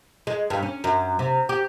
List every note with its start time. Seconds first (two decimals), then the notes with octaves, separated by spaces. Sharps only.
0.27 G#3
0.50 G2
0.63 C#4
0.84 F#2
1.19 C3
1.49 G4